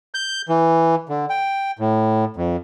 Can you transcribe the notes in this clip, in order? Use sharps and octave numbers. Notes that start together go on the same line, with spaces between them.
G6
E3
D3
G5
A2
F2